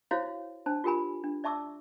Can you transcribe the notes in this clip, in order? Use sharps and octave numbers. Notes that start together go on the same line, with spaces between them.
E4 F#4 C5 C#5 F5
D4 C5 A5
F4 G4 A#4 G#5 B5
D4
D5 E5 A5 C#6 D6 E6